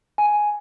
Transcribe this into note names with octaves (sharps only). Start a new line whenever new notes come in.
G#5